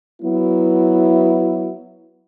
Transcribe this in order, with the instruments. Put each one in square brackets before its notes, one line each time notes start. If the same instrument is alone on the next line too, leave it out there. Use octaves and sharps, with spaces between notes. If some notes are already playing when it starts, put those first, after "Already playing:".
[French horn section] F#3 B3 E4